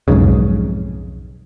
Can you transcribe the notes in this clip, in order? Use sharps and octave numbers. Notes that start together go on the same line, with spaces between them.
B1 F2 G#2 C#3